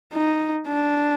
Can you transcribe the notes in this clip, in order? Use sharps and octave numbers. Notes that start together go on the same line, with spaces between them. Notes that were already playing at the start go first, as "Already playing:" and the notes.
D#4
D4